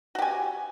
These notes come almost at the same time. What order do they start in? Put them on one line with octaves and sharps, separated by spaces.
F#4 G4 G#5